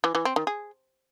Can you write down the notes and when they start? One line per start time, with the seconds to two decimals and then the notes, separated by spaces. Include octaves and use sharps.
0.04 E3
0.15 E3
0.25 C4
0.36 D#3
0.47 G#4